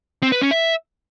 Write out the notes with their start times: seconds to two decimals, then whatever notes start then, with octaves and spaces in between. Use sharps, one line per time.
0.23 C4
0.32 B4
0.41 C#4
0.51 E5